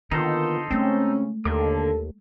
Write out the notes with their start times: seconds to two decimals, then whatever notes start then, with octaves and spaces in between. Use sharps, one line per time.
0.11 D3 D#3 A#3 B3 D#4 F4 A4 C5
0.71 C#3 G#3 A3 C4 C#4
1.45 D#2 D3 A#3 A4 D6